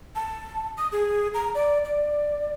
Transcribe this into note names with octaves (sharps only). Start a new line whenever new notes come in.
A5
D#6
G#4
A#5
D5
D5